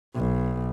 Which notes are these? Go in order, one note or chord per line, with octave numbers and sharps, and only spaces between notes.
B1